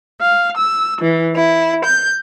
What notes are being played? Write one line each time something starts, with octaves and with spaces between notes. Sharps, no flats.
F5
E6
E3
E4
G6